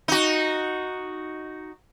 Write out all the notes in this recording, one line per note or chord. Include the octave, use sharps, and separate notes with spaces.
D#4 F#4